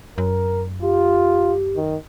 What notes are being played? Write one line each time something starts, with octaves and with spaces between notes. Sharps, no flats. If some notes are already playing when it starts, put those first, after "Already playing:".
F#2 A#4
F4 G4
D#3